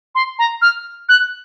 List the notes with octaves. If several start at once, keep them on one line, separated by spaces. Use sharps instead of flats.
C6
A#5
F6
F#6